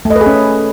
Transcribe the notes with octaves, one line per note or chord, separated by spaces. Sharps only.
A3
D#5
B4
G#4
C#4